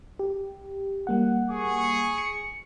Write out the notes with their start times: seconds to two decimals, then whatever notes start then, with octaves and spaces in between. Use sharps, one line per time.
0.19 G4
1.07 G3 A#3 F#5
1.49 G#4 C#6
2.18 C#7